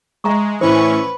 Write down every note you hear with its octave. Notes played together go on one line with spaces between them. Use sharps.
G#3 E5 A#5 C#6
A2 E3 C#4 B4 C5 C#6